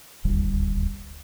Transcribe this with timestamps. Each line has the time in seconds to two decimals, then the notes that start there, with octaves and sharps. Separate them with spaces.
0.25 D#1 G#1 D2 G3